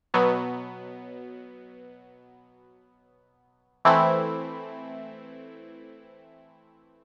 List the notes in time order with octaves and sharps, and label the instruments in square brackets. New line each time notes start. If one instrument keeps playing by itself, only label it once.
[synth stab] B2 F#3 B3
E3 A3 C4 E4